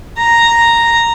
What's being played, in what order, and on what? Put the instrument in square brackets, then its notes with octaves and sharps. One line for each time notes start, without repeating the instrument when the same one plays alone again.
[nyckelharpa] A#5